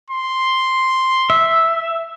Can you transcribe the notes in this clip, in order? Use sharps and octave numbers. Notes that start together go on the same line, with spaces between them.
C6
E5